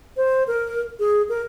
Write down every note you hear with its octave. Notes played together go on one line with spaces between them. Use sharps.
C5
A#4
G#4
A#4